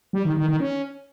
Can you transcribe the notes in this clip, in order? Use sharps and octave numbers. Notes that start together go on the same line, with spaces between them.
G3
D#3
D#3
D#3
C#4